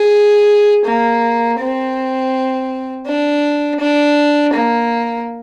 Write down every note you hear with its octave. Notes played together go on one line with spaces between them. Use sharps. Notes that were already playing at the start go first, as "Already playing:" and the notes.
Already playing: G#4
A#3
C4
D4
D4
A#3